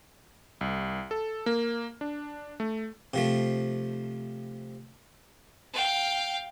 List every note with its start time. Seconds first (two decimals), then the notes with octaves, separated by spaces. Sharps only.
0.61 C2
1.11 A4
1.46 A#3
2.01 D4
2.60 A3
3.14 C3 F3 A3
5.73 F5 G5